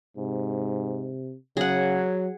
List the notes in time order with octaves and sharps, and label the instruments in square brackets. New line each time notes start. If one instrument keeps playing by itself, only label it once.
[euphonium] G#2 [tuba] C3
[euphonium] C#3 [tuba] F#3 [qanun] G#4 F#5